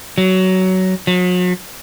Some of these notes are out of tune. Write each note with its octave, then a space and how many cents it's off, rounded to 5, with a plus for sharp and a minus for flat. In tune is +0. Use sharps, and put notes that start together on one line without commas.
F#3 +15
F#3 -40